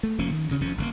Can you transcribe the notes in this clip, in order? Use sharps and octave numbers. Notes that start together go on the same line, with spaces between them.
A3
F1 F3 A#3 C#4
D#3
D2 C#3 C#4
F1 F2 F3 C#4
G1 C#3 A#3